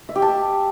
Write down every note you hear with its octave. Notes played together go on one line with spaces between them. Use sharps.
E5
G4
A5